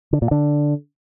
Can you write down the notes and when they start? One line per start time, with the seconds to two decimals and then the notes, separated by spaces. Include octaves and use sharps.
0.13 D3
0.22 A#2
0.31 D3